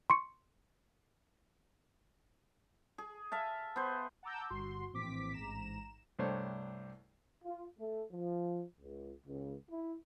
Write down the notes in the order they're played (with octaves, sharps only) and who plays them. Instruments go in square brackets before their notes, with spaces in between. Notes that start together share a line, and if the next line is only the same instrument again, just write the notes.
[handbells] C6 C#6 C#7
[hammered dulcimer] G#4
E5 F5 A5
B3 C5
[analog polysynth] F#5 A5 A#5 D6 E6 G6
G1 G2 F#4 C6
A#1 A2 E3 C4 D6 B6
A1 G#2 A#5 E7
[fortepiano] C2 G2 A3 D4 C5 C#5
[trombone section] F4
A3
F3
C#2
C#2
E4